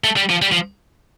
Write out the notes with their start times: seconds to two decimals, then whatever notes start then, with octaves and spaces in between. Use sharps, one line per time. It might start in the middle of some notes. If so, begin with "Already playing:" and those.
0.04 A3
0.17 G3
0.30 F3
0.42 G3
0.52 F3